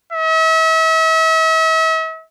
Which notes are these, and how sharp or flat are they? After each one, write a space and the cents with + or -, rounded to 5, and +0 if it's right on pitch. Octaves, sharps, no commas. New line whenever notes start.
E5 -40